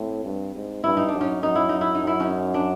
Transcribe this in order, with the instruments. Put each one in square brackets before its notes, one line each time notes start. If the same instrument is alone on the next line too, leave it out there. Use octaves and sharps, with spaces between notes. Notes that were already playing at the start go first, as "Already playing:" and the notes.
Already playing: [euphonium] A2 [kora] C4
[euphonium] G2
G#2
[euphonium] G2 [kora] E4
[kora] D#4
[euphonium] F#2 [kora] D4
[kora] C#4 D#4
[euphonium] F#2 [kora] D#4
[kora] E4
D#4
E4
D#4
[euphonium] F#2 [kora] E4
[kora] C#4 D#4
D4